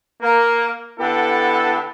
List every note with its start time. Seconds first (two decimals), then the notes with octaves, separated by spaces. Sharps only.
0.21 A#3
0.99 D3 B3 E4 G4 A4